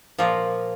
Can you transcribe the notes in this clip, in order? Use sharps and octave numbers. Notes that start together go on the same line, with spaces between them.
A#2 F3 A#3 F4